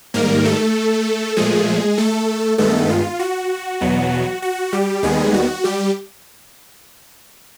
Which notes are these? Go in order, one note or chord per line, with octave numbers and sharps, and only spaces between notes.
G#2 D#3 G3 A#3 A#4
A3 A4
A#2 F3 G#3 A3 G#4
A3 A4
G2 D#3 G#3 A3 B3 A4
F4
F#4
E2 B2 F#3 B3
F#4
G3 G4
D#2 D#3 G3 G#3 B3 G#4
F#4
G3 G4